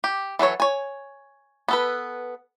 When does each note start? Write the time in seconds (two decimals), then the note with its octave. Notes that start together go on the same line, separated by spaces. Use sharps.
0.04 G4
0.39 E3 F#3 A4 C#5
0.60 C#5 G#5
1.68 B3 A4 B4